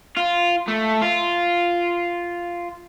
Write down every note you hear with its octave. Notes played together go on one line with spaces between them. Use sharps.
F4
A3
F4